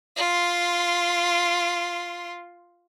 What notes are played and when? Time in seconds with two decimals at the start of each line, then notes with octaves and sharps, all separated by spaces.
0.17 F4 C6